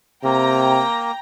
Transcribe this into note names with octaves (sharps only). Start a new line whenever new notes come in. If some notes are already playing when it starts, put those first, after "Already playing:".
C3 A#3 G5 A#5 A#6